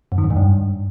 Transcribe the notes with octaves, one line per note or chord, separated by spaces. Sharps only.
F#2
D#3
F#2
G#2
G2